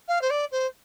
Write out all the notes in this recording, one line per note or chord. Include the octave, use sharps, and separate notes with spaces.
F5
C5
D5
C5